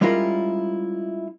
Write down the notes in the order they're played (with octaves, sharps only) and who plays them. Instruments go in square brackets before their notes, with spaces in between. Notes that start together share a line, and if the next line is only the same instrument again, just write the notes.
[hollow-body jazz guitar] G3 G#3 C#4 E4 F4 A#4